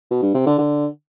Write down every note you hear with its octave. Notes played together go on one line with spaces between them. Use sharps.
B2
G2
C3
D3
D3